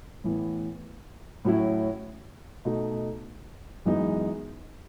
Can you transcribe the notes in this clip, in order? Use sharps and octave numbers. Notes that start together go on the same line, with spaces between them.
A2 E3 B3
A2 F#3 C#4 E4
B2 A3 D#4
F#2 E3 G#3 B3 D#4